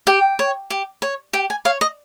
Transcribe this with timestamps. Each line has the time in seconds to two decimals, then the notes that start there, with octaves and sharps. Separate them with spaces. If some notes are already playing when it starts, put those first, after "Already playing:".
0.07 G4 G5
0.39 C#5
0.70 G4
1.02 C#5
1.33 G4 G5
1.50 G#5
1.65 C#5 F5
1.81 D#5